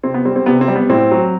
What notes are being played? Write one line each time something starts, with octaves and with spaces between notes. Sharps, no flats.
C3 C4
B3
G3 C4
C4
C3 B3
C4
G3
B3
A2 C4
F#3